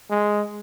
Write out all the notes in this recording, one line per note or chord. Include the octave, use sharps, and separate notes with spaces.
G#3